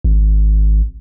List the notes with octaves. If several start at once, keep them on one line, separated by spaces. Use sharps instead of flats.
G#1